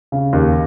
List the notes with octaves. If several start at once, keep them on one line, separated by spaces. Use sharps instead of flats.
C#3
D#2